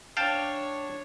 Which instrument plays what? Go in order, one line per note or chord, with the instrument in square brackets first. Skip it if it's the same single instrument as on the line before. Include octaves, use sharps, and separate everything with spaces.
[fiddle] D4 C#5 [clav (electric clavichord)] F5 G5 A5